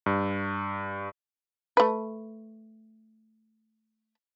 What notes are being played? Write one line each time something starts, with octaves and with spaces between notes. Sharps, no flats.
G2
A3 B4